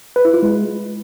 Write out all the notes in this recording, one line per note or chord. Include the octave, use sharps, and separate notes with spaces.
B4
E4
F4
G#3